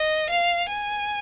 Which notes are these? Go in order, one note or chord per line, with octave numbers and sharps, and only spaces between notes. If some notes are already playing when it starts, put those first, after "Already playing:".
Already playing: D#5
F5
G#5